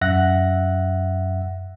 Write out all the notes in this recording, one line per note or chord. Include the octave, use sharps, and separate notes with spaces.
F#2 E5 F#5 F#6 A#6